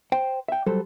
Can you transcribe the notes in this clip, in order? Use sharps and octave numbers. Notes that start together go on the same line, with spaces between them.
C5 G5
E5 G5
F#3 G3 A4 C5